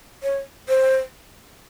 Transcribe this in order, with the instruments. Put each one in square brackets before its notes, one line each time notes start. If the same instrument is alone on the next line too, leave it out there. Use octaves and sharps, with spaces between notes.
[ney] C#5
C5